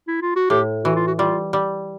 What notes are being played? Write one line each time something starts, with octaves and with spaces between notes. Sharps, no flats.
E4
F4
F#4
A2 G4
E3 F#4
F4
F#4
G3 F4
G3